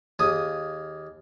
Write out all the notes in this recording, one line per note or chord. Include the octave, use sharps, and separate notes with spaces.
D#2 A#3 G#4 D#6